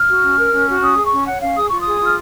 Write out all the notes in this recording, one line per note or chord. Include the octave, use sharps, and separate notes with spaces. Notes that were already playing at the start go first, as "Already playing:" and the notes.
Already playing: F6
F#4
C#4
A#4
C#4
F#4
C#4 D#6
G#4
C#6
C#4
C#5 F#5
C#4 F5
G#4 D#6
F4 C#6
D#6
G#4
F4 F6